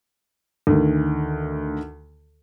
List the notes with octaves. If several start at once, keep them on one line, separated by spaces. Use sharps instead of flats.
D2 D#3